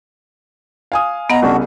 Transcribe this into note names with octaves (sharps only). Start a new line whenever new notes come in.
F5 G#5 D#6
B3 D#5 F#5 A#5
C2 C#3 D4 F#4